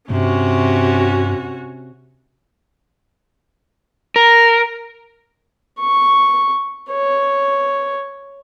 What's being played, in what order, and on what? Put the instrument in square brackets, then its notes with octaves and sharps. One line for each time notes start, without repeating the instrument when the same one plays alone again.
[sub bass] G2 [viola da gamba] C3 [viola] C#4 F#4
[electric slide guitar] A#4
[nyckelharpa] C#6
C#5